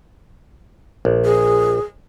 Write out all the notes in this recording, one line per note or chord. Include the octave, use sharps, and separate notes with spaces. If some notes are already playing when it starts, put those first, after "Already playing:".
A#1
G#4